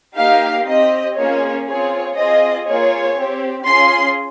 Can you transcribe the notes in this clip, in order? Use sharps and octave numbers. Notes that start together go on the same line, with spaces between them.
A#3 D#4 G4 F5
C4 G4 D#5
A#3 C#4 F4 G#4 C#5
C4 F4 G#4 C#5
C4 F4 G#4 D#5
A#3 F4 G#4 C#5
C4 G4
C#4 F4 G#4 C6